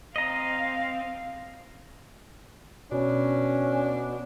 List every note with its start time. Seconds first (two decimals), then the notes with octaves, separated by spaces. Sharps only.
0.16 C4 D#5 F5 A#5
2.92 B2 C#4 D4